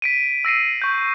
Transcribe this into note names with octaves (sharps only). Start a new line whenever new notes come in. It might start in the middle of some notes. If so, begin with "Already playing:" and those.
B6 D7 D#7
E6 A#6 C7 D#7
C#6 G6